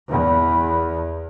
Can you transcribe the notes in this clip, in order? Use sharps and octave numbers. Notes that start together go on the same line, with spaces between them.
E2